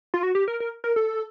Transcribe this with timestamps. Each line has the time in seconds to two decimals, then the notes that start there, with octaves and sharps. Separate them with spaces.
0.14 F4
0.23 F#4
0.35 G4
0.48 A#4
0.60 A#4
0.84 A#4
0.96 A4